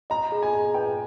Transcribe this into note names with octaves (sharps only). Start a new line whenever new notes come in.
D#5 A#5
G#4
G#5
G#4
B4 G5